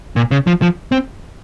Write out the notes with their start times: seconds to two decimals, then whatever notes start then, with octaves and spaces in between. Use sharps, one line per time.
0.16 A#2
0.31 C#3
0.47 F3
0.62 F3
0.92 C4